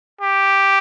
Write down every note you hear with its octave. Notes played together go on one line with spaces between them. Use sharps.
G4